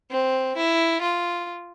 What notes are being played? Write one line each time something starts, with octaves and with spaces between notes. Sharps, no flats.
C4
E4
F4